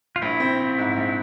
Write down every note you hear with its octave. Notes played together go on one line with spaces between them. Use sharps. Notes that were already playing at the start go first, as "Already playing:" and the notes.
F4
A#1 E4
C4
C4
G#2
A#1